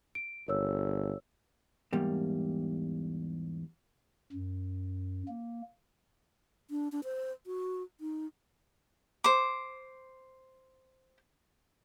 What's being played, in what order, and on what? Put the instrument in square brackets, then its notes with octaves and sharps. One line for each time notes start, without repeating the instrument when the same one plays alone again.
[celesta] D7
[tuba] G1 [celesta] A#4 C#5 E6
[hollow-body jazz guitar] E2 G#2 G3 A#3
[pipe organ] F#2
A#3
[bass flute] D4
D4
C5
F#4
D#4
[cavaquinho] C5 D6